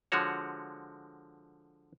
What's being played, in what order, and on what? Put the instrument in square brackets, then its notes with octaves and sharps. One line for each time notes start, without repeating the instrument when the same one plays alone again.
[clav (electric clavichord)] D3 F3 G#3 F#4 C#5